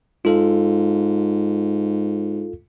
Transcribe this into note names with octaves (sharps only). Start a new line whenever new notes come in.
G#2 F4 A4 F5